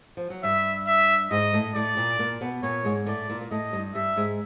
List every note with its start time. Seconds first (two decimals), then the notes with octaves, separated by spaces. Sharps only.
0.17 F3
0.30 F#3
0.43 G2 G3 E5
0.87 E5
1.31 G#2 G#3 D#5
1.53 A2 A3
1.75 A2 A3 D5
1.97 A#2 A#3
2.19 A#2 A#3
2.41 B2 B3
2.63 A#2 A#3 C#5
2.85 G#2 G#3
3.07 A2 A3 D5
3.30 A#2 A#3
3.41 A#3
3.51 A2 A3 D#5
3.73 G2 G3
3.95 G2 G3 E5
4.17 G#2 G#3